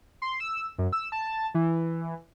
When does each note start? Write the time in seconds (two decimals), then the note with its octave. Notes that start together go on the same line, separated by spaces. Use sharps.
0.22 C6
0.40 E6
0.78 F#2
0.93 E6
1.12 A5
1.54 E3